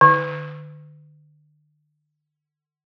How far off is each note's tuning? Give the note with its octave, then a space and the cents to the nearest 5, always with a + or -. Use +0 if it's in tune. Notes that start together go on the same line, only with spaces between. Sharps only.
D3 +40